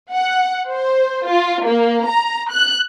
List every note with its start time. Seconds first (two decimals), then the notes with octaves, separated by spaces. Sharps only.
0.12 F#5
0.70 C5
1.26 F4
1.64 A#3
2.07 A#5
2.51 F#6